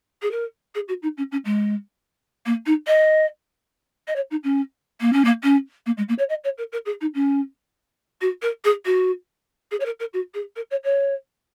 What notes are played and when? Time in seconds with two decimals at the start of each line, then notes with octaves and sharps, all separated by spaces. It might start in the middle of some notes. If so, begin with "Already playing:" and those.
0.22 G#4
0.31 A#4
0.75 G#4
0.88 F#4
1.02 D#4
1.17 C#4
1.32 C#4
1.45 G#3
2.46 A#3
2.66 D#4
2.87 D#5
4.07 D#5
4.16 C#5
4.31 D#4
4.44 C#4
5.01 A#3
5.13 C#4
5.24 A#3
5.43 C#4
5.86 A#3
5.97 G#3
6.08 A#3
6.18 C#5
6.29 D#5
6.44 C#5
6.58 A#4
6.72 A#4
6.86 G#4
7.01 D#4
7.14 C#4
8.21 F#4
8.42 A#4
8.64 G#4
8.85 F#4
9.71 G#4
9.80 C#5
9.85 A#4
10.00 A#4
10.13 F#4
10.34 G#4
10.56 A#4
10.71 C#5
10.84 C#5